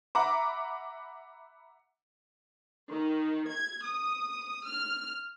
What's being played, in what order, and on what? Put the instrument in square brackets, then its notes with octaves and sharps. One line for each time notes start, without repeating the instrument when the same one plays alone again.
[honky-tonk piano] E5 F#5 A#5 B5 D6
[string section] D#3
G#6
D#6
F6